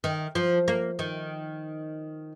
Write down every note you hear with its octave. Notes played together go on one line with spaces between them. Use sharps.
D#3
F3
A#3
D#3